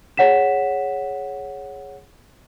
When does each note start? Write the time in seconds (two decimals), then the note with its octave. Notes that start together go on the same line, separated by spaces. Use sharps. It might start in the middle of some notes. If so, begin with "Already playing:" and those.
0.17 G#4 C#5 F#5 B6 E7